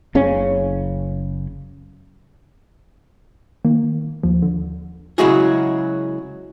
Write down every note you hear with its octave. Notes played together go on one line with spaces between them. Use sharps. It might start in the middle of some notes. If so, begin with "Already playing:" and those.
F#1 C#3 C#4
D#3 A#3
D#2 F3
D3
C#3 F#3 G#3 E4 F#4 G#4